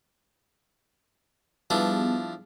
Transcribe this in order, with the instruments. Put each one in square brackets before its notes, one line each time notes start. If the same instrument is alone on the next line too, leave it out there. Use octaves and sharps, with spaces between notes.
[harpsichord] F3 D4 E4 [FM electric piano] G3 B3 G#4